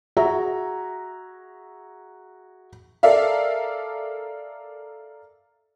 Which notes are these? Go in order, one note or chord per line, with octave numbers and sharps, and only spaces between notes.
F#4 G#4 E5 A#5
A4 A#4 D5 E5 F5